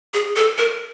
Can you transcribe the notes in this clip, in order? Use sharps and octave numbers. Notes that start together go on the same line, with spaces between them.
G#4
A4
A#4